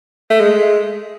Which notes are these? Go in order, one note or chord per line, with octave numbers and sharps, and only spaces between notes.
A3
G#3